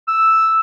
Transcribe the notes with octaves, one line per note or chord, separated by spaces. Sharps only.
E6